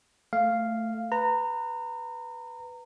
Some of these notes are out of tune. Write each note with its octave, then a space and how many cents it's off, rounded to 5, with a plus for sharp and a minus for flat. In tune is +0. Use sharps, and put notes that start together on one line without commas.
A3 +10 F5 -5
B4 +0 A#5 -25